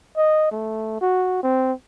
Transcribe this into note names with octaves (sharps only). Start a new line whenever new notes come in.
D#5
A3
F#4
C4